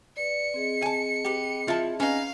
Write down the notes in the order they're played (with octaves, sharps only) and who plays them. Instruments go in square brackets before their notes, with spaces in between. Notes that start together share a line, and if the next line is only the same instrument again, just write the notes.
[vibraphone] B4 D5 [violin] C#7
[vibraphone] C4 G#4 D#5
[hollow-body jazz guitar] G#5 A5
[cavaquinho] G4 B4
[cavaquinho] E4 [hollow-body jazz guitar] F4 A5
[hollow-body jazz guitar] C#4 [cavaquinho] D#4 B4 [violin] F5